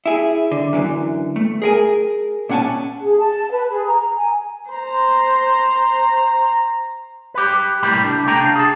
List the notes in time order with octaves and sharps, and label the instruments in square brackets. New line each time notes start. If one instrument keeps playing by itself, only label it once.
[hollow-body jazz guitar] E4 G#4
D3
F#2 D3 E3
A3
G#4 A#4 G#5
A#2 C#4 F#5 G#5 A5
[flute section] G#4
A5
B4
G#4
A#5
G#5
[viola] C5 [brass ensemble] A#5
[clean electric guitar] G4 B4
C2 A2 G3 A#3 G4 B5
D4
C3 A3 C#4 G5 A#5
D4 F5
G#4 A5